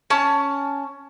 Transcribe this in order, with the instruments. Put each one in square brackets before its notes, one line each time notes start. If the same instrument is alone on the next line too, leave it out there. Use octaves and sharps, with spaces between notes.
[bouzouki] C#4 A5